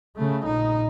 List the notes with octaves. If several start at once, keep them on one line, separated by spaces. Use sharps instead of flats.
C#3 A3
A#1 D#4